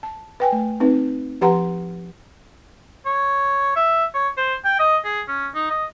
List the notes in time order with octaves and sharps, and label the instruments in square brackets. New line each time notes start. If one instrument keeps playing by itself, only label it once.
[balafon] A5
B4 G5 G#5
A3
C4 D#4 B4
F3 G4 B4 F#5 A#5 C6
[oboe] C#5
E5
C#5
C5
G5
D#5
G#4
C#4
D#4
D#5